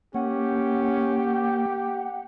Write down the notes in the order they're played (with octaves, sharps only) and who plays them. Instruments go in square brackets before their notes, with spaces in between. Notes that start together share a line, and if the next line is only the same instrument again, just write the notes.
[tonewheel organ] A#3 [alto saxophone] C#4 [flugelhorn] G4 [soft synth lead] F#5